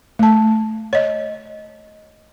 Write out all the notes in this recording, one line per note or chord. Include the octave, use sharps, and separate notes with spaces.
A3 A5
C#5 D#5